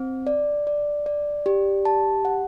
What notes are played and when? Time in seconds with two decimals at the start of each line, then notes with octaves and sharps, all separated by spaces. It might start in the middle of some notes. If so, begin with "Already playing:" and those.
Already playing: C4
0.27 D5
0.67 D5
1.06 D5
1.46 G4
1.85 A5
2.25 F#5